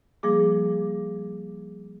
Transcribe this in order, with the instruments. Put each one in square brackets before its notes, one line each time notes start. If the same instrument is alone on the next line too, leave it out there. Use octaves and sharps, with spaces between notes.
[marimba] F3 G3 A#3 G#4 D6